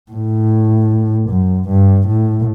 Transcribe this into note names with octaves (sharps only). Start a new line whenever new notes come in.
A2
F#2
G2
A2